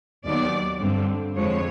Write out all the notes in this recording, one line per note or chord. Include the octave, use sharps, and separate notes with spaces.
D#2 D#3 F#3 B3 D5
G2 D3 G3 C4
F2 D3 F3 G#3 C#5